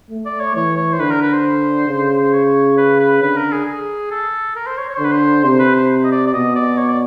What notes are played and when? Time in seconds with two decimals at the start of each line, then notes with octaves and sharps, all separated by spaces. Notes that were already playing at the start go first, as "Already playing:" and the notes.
0.11 A3
0.26 D5
0.40 C#5
0.55 E3 C#5
0.77 C#5
0.93 C5
0.99 D3 B4
1.11 A#4
1.22 B4
1.33 C5
1.88 C#3
2.22 C5
2.33 C#5
2.77 B4
3.00 B4
3.22 D3 B4
3.37 A#4
3.52 G#4
3.66 G#4
4.11 A4
4.56 A#4
4.67 C5
4.78 C#5
4.89 C#5
4.96 C5
5.00 D3 B4
5.12 C5
5.44 C3 C5
5.59 B4
5.74 C5
6.04 D#5
6.12 D5
6.27 D5
6.33 B2 D#5
6.55 D5
6.78 C#5
6.89 D5